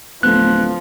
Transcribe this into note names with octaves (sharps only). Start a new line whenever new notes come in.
D1 F3 A3 B3 F#6